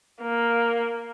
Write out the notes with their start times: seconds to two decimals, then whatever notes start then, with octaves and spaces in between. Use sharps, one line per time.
0.21 A#3